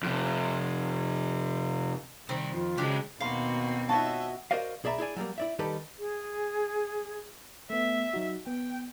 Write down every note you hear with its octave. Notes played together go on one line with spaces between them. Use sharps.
F2 C3
C3 D#3 G3 C4
F2 F4
C#3 F#3 G#3 D4 G4
D#2 B2 A#3 C4 F#4 F5 B5 C6
F#4 C#5 D#5 E5 A5
F#4 A#4 C5 D5 D#5 F5
B1 G#4 D5 E5 A#5 B5
E4 G#4 D5 G#5
F#3 G3 A3 A#3
E4 D5 E5
D#3 G3 D#4 G4 A4 B4
G#4
A3 B3 E5
F#3 D#4 F#4
B3 G5